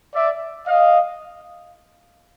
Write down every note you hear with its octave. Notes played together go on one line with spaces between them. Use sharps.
D5 E5
D#5 F5